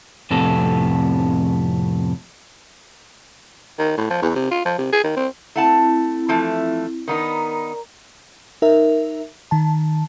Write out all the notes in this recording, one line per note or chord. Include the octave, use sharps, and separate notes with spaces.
F2 A2 C3 B3 A4
D#3
A2
F3
E2
C3
F4
F3
C3
G#4
D#3
C4
A3 C4 E4 F#5 A5
E3 F3 A3
D#3 B3 D#4 A#4 D5 A#5
D#4 A#4 E5
D#3 A5